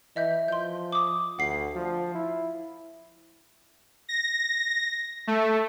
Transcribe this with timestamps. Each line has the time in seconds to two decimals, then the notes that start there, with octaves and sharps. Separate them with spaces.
0.16 E3 D#5 E5 G6
0.48 F3 C6 G6
0.92 D6 D#6
1.39 D2 F#5 C7
1.75 F3
2.15 E4
4.09 A#6
5.27 A3